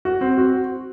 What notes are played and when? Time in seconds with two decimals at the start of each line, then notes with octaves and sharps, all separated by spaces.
0.05 F#4
0.21 C4
0.38 F#4